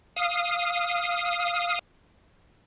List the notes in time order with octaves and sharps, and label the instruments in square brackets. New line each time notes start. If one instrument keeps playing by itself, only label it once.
[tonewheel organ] F5 D#6